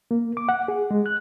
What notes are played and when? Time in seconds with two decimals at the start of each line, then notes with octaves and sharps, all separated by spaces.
0.11 A#3
0.37 D6
0.49 F#5
0.68 G#4
0.91 G#3
1.06 F#6